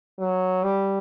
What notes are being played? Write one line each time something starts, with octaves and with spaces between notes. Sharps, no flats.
F#3
G3